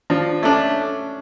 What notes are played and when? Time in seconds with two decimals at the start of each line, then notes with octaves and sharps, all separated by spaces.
0.10 F3 D4
0.42 A3 C#4 D4